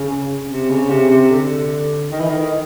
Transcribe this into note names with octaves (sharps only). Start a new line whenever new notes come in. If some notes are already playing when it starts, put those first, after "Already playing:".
Already playing: C#3
C3
C#3
C3
C3
D3
D#3
E3
D#3